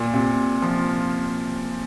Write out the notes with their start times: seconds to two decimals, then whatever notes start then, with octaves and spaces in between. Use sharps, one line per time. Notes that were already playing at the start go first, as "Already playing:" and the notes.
Already playing: A#2
0.14 C3
0.62 F3